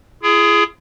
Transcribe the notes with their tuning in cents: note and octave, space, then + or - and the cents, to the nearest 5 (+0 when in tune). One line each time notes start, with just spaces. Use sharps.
E4 +45 G#4 +5